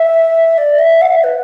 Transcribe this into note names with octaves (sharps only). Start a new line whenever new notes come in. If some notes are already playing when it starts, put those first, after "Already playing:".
Already playing: E5
D5
E5
F#5
E5
B4